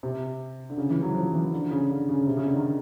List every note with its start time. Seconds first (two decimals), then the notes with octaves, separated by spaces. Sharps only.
0.03 C3
0.70 D3
0.78 C#3
0.90 E3
1.02 F#3
1.15 F3
1.34 E3
1.52 D3
1.71 C#3
1.90 D3
2.09 C#3
2.27 C3
2.37 C#3
2.46 D3
2.55 D#3